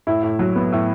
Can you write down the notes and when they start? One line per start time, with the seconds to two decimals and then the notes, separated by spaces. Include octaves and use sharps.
0.07 A2 E4
0.23 A2
0.39 F#3
0.56 B3
0.72 A2